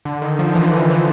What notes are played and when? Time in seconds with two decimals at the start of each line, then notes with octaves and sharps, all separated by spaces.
0.05 D3
0.22 D#3
0.39 F3
0.55 E3
0.73 D3
0.90 E3